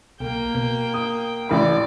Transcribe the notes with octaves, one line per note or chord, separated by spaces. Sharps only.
B1 A#3 G5
B2
D#6
A1 D5 B5